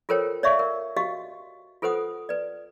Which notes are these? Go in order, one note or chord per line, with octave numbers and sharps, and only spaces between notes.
F4 A4 A#4 C5 C#5 G5
C#5 D5 E5 F5 C#6
A#4
F#4 G4 D#5 F5
F4 A4 B4 C5 F#5 D#6
B4 D5